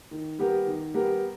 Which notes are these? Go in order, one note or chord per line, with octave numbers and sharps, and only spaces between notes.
D#3
G3 B3 G4 A#4
D#3
G3 B3 G4 A#4